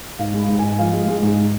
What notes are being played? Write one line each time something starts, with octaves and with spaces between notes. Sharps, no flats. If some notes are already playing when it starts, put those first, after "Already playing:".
G#2 F5
G#3
B5
G#2
G#5
G#2
F3 F5
G#3
G#3
G#2